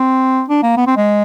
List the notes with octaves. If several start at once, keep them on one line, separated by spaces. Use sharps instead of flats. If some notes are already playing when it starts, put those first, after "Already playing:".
Already playing: C4
D4
A#3
B3
C4
G#3